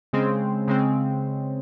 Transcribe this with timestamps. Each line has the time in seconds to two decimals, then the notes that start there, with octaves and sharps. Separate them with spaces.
0.13 C#3 G#3 C4
0.68 C#3 G#3 C4